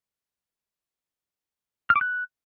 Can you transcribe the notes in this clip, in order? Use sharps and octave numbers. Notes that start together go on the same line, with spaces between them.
F6
D6
F#6